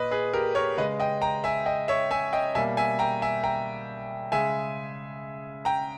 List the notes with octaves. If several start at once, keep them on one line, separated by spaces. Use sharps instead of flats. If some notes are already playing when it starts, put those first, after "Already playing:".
Already playing: A#2 B4 D#5
G#4 B4
G4 A#4
A#4 C#5
C#3 G#3 B4 D#5
D#5 G5
G5 A#5
E5 G#5
D#5 G5
C#5 E5
E5 G#5
D#5 G5
B2 G3 A#3 E5 G#5
E5 G#5
G5 A#5
E5 G#5
G5 A#5
C#3 G#3 E5 G#5
G5 A#5